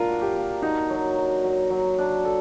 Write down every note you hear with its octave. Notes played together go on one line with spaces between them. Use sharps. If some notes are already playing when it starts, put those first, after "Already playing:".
Already playing: A#3 D4 F4 A#4
F#4
G4
A#3
D#4 F#4
F#3
F#4
F#3
F#3
D4
A4